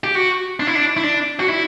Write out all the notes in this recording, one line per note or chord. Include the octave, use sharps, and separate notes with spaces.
G4
F#4
D4
E4
D4
E4
D4
F#4
E4